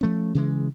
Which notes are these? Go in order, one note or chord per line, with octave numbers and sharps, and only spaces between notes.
F3 A3 C#4
C#3 E3 G#3